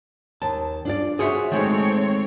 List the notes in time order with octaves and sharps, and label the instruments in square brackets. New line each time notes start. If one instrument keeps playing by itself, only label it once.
[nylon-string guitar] D#2 [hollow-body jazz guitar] A5
[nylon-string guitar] D4 F4 D5
[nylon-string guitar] F#4 E5 [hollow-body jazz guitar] G#4 C5 C#5
[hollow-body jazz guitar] D#3 G#3 A3 [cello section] C4 C#5